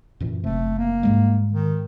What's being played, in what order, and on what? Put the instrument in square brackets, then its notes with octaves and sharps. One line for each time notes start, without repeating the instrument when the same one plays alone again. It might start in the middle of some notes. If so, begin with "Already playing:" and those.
[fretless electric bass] F#2 A#2 E3
[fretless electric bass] F#1 C3 [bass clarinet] A3
[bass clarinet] A#3
[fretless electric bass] G#2 G3 G#3
[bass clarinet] D#3